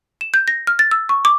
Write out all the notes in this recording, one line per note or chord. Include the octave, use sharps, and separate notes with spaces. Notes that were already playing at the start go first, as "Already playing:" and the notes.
E7
G6
A#6
F6
A6
E6
C#6
D6